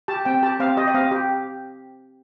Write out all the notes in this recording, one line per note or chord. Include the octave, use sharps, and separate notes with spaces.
G4 A5
C4 G5
G4 A5
C4 F5
G4 D#5
D#5
C4 F5
G4